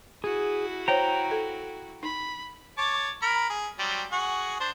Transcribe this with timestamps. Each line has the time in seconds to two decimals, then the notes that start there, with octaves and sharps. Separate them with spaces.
0.24 E4 F#4 G#4
0.88 C5 C#5 G5 A#5
1.31 A4
2.03 D#4 B5
2.78 C#5 A5 D6
3.22 A#4 B5
3.50 G#4
3.79 F#3 G3 C4
4.12 F#4 G#4 F#5
4.60 D4 C5